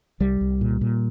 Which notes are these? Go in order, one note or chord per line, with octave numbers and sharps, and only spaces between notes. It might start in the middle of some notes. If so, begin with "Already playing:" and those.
C2 G3
C2
A#2
A#2